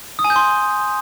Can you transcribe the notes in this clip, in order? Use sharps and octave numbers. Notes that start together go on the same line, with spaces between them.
D#6
G#5
G6
C6